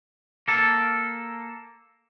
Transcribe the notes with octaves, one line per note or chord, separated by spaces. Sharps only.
A#3 A4